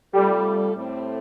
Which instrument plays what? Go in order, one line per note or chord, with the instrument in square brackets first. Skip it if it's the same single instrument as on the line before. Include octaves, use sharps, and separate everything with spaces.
[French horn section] C3 A3 F4 A4 [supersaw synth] G3
[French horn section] A2 A3 C4